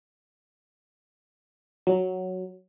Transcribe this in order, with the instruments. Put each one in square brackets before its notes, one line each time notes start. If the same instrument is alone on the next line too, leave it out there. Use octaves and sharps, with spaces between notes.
[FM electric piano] F#3